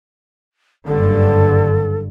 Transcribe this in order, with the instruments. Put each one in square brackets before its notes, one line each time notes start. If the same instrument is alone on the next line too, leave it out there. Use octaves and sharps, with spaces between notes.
[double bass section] F#1 G2 D3 [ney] A4